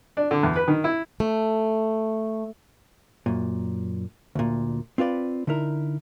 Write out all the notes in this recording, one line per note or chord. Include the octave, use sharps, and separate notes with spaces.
D4
D3
E2
B4
D#3
E4
A3
F#2 A#2
D2 A#2
C4 F4 B4 D5
D3 D#4 E4 A#4